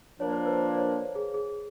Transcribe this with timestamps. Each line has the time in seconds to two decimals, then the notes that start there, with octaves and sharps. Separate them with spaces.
0.20 F3 A#3 D4 F4 A#4 C#5
0.33 C5
0.46 B4
0.58 C5
0.78 C#5
1.15 G#4
1.34 G#4